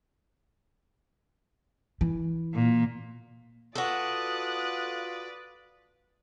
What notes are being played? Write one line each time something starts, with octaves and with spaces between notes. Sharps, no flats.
E3
A#2
F4 F#4 A4 B4 D5 D#6 F#6